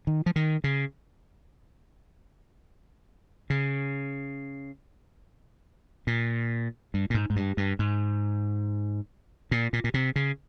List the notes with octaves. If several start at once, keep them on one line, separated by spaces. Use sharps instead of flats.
D#3
F3
D#3
C#3
C#3
A#2
G2
A#2
G#2
G#2
G2
G2
G#2
A#2
A#2
A#2
C3
C#3